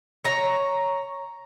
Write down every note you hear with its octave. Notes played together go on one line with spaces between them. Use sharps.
C#5 A#5